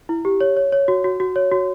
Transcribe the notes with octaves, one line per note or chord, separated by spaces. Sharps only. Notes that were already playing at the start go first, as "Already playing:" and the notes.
E4
G4
C#5
C#5
C#5
F#4
F#4
F#4
C#5
F#4